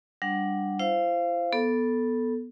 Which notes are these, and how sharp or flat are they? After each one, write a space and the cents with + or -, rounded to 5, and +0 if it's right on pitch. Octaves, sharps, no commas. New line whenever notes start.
G3 +0 D4 +0 F#5 -5
E4 +40 C5 +0 F5 -15
B3 -10 A4 +0